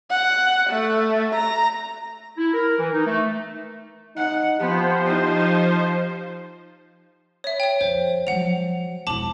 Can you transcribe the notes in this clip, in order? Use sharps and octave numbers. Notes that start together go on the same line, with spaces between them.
F#5
A3
A#5
E4
A#4
E3
D#4
A3
D#4 F#5
F3 B3 G4 C5
D#4
C#5 E5
C#5 G5
F2 C5
F3 F#3 F#5 F7
E1 E4 A5 D6 F#7